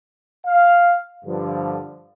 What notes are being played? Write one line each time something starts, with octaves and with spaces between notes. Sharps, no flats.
F5
G2 D3 F3